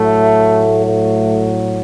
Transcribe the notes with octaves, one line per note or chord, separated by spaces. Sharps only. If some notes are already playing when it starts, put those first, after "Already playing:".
Already playing: A2 F#3 A3
A3